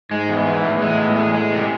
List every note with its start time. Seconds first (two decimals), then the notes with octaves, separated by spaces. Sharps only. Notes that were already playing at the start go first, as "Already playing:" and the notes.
0.11 G#2 G#3
0.29 E2
0.46 E3
0.64 E2 A2
0.82 G#3
0.98 E2
1.16 G#3
1.35 G#3
1.52 C3